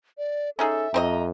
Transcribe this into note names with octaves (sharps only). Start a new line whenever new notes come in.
D5
C#4 D#4 G#4 A4 E5
F2 C4 C5 D#5 A#5